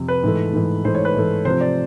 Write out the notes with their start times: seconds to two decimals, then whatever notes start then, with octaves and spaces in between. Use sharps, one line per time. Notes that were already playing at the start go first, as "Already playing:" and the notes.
Already playing: F2 C3
0.08 B4
0.23 G#2 E3 A3
0.53 G#2 E3 A3
0.84 G#2 E3 A3 C5
0.95 C#5
1.05 B4
1.14 G#2 E3 A3
1.45 C3 F3 A3 C5
1.61 D5